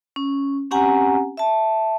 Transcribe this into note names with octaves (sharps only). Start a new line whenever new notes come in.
C#4
C4 C#4 G4 F#5 G#5 A#5
E5 A5